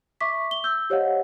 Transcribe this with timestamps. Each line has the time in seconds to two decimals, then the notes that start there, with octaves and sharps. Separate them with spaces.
0.21 E5 C#6 D6 B6
0.51 G7
0.64 E6 G6
0.90 G4 C5 C#5 D#5 F5 F#5